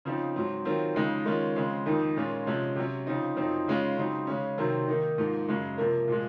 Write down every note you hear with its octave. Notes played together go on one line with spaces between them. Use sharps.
C#3 F3 C4 D#4
G#2 F#3 C4
D#3 F#3 C4 F4
F2 C#3 G#3 D#4
D#3 G#3 C#4 F4
C#3 F3 G#3 C4
F2 D#3 A#3 D#4
A#2 G#3 C#4 F4
C3 F3 G#3 C#4
C3 F#3 C#4
C#3 F3 C4 D#4
F#2 F3 C4 D#4
C#3 G#3 C#4 F4
C#3 F#3 C4 D#4
C#3 G#3 C#4
C3 D#3 F#3 C4
D#3 A#3 D#4
G#2 F3 A#3
F#2 C#3 G#3
C3 F3 A#3
A#2 F3 G#3